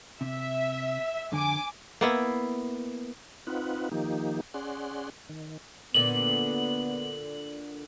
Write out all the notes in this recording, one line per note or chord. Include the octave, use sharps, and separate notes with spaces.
C3 E5
F2 D3 G#5 D6
A#3 B3 E4
C4 D#4 F4 B4 F#5
D#3 F3 A#3 D#4 G4
C#4 G#4 D5 F#5 C6
D#3
A#2 D3 B3 F#7